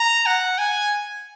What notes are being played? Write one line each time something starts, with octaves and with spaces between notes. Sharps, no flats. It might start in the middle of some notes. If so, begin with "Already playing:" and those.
Already playing: A#5
F#5
G#5